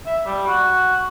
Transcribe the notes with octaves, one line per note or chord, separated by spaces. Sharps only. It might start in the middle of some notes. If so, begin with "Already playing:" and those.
E5
G3
F#4